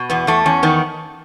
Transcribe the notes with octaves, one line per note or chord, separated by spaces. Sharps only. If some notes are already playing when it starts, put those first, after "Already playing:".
Already playing: B2
E2 B3
E2 A3
E2 C#4
D#3 B3